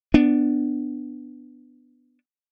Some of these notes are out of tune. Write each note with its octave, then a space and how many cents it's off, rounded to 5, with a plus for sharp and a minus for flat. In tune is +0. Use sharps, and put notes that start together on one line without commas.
B3 +10 D4 +10